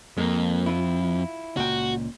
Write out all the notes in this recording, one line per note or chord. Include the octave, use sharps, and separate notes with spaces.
F2 G#3 A#3
E4 F4
C#2 A#2 F#4 G5